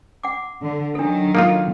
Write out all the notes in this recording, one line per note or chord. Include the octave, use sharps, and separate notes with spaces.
F#5 D6
D3
D#3 F#3 D4 A4
A#3 D#4 F4 A4 C6